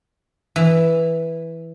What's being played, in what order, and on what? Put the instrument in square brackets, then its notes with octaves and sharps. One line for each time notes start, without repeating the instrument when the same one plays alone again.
[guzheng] E3